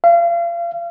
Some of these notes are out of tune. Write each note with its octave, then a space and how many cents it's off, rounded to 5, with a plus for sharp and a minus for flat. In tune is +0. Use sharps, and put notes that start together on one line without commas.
F5 -35